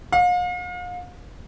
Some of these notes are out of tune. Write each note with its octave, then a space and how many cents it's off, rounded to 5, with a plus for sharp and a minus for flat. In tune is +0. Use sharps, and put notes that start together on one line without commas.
F5 +40